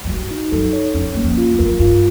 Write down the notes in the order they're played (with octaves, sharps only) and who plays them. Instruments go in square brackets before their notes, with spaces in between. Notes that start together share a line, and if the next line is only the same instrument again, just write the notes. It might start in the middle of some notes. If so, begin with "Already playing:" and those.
[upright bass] F#2
[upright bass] G2 [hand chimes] F#4
[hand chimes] D#4
[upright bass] F#2 [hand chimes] A4
[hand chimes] C#5
[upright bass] F2 [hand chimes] C#4
[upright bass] F#2 [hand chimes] A#3
[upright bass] F2
[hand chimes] F4
[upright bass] F#2
[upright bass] F2 [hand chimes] A#4
[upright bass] F#2
[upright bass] G2 [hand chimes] F4